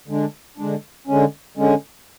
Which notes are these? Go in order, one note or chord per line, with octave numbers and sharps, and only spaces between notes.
D3 G#3 D4
D3 G#3 D4
D3 G#3 C#4
D3 G#3 C#4